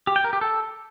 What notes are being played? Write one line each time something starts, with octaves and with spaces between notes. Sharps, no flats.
G4
G5
A#4
G4
A4